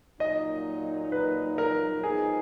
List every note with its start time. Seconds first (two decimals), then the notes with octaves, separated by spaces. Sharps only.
0.20 A#2 F#3 A#3 D#4 D#5
1.12 B4
1.58 A#4
2.03 F3 G#3 B3 D#4 G#4